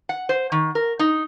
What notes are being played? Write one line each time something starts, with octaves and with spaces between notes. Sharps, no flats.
F#5
C5
D#3
A#4
D#4